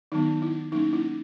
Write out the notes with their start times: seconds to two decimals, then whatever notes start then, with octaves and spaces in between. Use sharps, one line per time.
0.12 D#3 F#3 B3 D#4
0.42 E4
0.72 F#3 A#3 C#4 D#4
0.93 E4